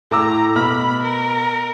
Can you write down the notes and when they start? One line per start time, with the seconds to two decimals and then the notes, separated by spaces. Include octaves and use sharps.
0.11 A2 A#5 D6 E6
0.56 B2 B5 F6
1.03 A#4